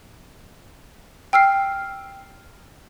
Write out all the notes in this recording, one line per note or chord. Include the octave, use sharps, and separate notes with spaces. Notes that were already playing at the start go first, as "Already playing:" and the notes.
G5 E6 F6 C7